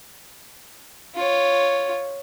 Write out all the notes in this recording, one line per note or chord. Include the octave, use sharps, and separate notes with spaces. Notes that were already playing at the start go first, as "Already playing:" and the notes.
F4 C#5